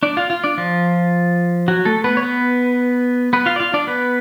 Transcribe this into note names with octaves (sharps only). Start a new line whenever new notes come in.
D4 D5
F4 F5
F4 F5
D4 D5
F3 F4
F#3 F#4
A3 A4
B3 B4
C#5
B3 B4
B3 B4
F4 F5
D5
F4 F5
D4 D5
B3 B4